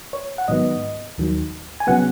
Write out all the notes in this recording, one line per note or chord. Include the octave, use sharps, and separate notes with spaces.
C#5
F#5
G#2 D#3 F#3 B3 D#5
D#2 D#3 F#3
G#5
C#3 F#3 B3 F#5